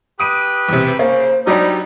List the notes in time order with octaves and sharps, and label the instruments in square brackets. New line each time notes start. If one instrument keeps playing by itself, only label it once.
[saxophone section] G4 B4 [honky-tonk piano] D#6 D7 D#7
[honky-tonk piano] E2 C3
[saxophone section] C#3 [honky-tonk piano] A#3 [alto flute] C5
[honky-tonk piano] F#3 D4 [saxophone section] G3 D#4